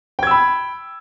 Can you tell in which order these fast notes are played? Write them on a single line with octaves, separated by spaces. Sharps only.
G5 G#6 E6 B5